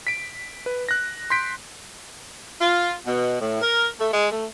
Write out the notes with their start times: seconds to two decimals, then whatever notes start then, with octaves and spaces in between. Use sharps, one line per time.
0.07 B6 D7
0.66 B4
0.89 F#6 A#6
1.30 C6 G6 B6 D7
2.60 F4
3.06 B2
3.40 A2
3.61 A#4
3.99 A3
4.13 G#3
4.31 A3